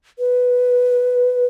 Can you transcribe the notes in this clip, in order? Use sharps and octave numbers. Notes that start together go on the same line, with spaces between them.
B4